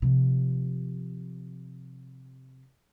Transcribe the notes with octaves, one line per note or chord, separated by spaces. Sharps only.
C3 F3